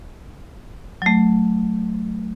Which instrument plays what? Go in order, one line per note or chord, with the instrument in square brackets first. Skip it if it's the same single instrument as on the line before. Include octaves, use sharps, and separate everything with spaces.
[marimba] F#3 A3